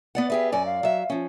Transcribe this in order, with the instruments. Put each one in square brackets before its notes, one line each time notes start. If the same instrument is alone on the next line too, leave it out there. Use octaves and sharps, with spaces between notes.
[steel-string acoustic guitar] B3 D5 F#5
[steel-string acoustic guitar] G4 G#4 B4 [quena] E5
[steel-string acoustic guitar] F#2 D5 [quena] G#5
[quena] F5
[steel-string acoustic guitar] F#3 E5
F3 C#4